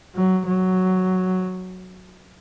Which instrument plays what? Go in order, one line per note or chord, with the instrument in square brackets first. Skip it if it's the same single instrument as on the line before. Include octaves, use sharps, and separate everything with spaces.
[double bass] F#3
F#3